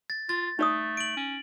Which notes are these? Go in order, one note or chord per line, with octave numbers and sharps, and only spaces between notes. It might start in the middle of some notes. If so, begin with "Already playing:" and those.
A6
F4 A6
A3 D#4 D5 D#6
D7 F#7
C#4